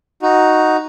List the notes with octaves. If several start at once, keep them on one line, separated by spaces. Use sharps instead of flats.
D#4 F#4